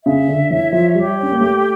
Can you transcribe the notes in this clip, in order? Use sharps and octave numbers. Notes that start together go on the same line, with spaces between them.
C#3 E5
D3
E3 C#5
F3
G3 G4
C#4
A#3
A3 G5